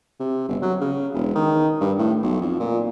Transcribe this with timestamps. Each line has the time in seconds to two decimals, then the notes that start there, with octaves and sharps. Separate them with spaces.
0.20 C3
0.48 G1
0.62 F#3
0.81 C#3
1.14 E1
1.35 D#3
1.81 G2
1.98 A2
2.23 B1
2.41 F2
2.60 A#2